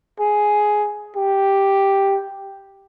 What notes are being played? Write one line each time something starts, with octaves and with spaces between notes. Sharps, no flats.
G#4
G4